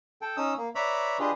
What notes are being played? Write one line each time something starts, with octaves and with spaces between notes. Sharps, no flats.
A4 G5
C#4 D#4 D#6 E6
A#3
B4 C#5 D5 E5 A#5 B5
D4 F4 G4 G#4 B4 D#5